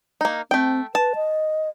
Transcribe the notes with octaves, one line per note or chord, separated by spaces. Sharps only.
A#3 D#4
A3 C4 G5
B4 A5
D#5